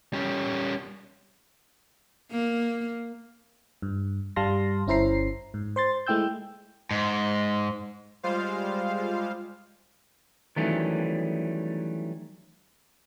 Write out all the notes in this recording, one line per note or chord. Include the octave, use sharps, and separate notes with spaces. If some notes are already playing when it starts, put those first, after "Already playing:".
G3 C#4
A#3
G2
G2 G3 F5 A5 C6 A#6
G1 C#4 E4 C5 A#5 C7
G#2
C5 C6 A6
G#3 A3 E4 G5 E6 G6
G#2
G3 G#3 F4 C5 F5
D#3 E3 F#3 G3 A3 C#4